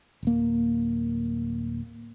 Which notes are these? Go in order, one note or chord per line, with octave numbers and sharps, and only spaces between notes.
D1 A#3